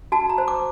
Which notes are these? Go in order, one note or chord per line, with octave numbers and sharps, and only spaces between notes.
F#4 A5
A#5
C5
D6